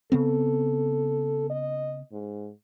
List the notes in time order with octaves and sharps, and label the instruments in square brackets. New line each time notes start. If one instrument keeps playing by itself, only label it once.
[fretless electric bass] C#3 B3 C4 [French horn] A4
[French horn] D#5
G#2